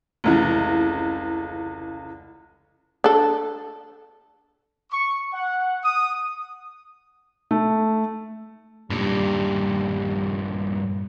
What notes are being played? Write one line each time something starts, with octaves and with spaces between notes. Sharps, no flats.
F1 C#2 E3
D4 A4
C#6
F#5
D#6
A3
G2 A#2 G3